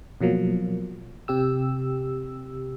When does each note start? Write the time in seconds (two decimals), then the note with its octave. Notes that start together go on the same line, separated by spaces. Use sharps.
0.21 B2 F3 F#3 A#3
1.28 C3 G4 E6